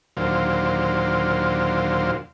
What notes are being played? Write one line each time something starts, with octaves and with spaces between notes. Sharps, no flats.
D#2 A#2 D3 F#3 C5 F5